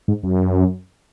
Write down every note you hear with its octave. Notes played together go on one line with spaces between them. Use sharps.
G#2
F#2